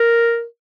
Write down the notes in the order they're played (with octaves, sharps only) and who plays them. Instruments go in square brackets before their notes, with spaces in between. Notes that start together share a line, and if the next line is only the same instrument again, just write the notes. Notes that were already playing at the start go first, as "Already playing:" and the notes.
Already playing: [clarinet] A#4